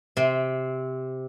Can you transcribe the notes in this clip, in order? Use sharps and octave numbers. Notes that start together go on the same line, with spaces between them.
C3 C4